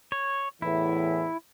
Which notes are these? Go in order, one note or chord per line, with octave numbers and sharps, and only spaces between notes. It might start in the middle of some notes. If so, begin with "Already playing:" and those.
C#5
E2 A2 E3 E4